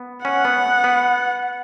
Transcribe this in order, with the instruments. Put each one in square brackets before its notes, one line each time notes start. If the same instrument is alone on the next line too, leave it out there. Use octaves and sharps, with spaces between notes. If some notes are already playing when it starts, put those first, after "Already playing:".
Already playing: [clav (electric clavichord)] B3
[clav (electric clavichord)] C#4 [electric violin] F#5
[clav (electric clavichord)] B3
B3